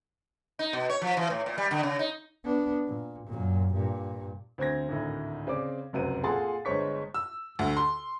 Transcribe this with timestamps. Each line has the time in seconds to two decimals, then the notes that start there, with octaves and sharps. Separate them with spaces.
0.59 D#4
0.73 B2
0.90 C#5
1.02 F3
1.17 E3
1.30 A2
1.46 A#2
1.58 G3
1.71 D3
1.83 C#3
1.99 D#4
2.44 B3 D4
2.86 A#2
3.27 F#2 A#2
3.74 G2 A#2
4.58 D2 C4 C5 G#6 A#6
4.89 G#1 D2 A2 D#3
5.47 C#3 C4 D5 D6
5.93 F1 C#2 F#2 F#4 C5 D#7
6.23 A#2 G#4 A4 F#5 C6 A6
6.65 G1 G#3 C5 C#5 C#6 B6
7.14 E6
7.59 D2
7.77 C6